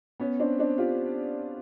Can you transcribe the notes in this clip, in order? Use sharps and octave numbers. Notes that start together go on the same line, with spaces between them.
B3 C#4
C4 D4
C4 D4
F4 G4